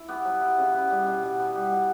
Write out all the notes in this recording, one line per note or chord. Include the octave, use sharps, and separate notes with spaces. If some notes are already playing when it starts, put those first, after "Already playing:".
Already playing: E4
B3 G4
F#3
E4
C#3
B3
G3
B2
B2
B3
G3
B2